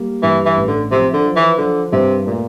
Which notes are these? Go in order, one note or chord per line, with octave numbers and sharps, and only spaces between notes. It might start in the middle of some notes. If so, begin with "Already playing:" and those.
Already playing: G3 A#3
G2 E3
E3
A1
D3
C3 F3
D3
F3
E3
D3 F3
G2 C3
A#2 A3